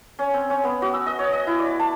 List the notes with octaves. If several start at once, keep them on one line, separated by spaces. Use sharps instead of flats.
C#4
C4
C#4
B3
F#4
E6
D#5
C#5
D#5
E4
D5
A5